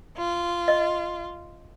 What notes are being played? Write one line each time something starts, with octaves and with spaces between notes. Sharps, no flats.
F4
D#5